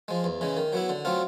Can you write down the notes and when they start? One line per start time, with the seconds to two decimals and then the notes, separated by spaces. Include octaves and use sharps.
0.08 F3 G#3
0.24 E2
0.41 C#3 E3 G#3
0.57 D#3
0.73 F#3 B3 E4
0.89 D3
1.05 F#3 A3 C4 F4